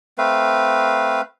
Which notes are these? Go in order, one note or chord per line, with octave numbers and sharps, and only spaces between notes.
A3 C4 B4 F5